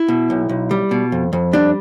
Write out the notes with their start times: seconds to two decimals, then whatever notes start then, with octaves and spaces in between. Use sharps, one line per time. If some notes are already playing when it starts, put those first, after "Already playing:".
Already playing: E4
0.08 B2
0.30 B1
0.49 B1
0.71 G3
0.91 B2
1.12 F2
1.33 F2
1.53 G3 D4